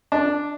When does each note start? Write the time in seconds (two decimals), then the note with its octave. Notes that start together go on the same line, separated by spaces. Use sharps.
0.12 D4